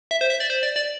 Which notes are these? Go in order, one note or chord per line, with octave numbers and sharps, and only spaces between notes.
E5
C5
E5
D5
C5
D5
D5